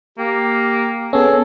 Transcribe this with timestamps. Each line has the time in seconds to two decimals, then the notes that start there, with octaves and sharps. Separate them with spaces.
0.18 A#3 G4
1.13 B3 C#4 G#4 A4